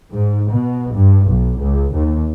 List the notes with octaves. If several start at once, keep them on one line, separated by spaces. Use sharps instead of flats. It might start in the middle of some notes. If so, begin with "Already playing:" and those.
G#2
B2
G2
B1
C#2
D#2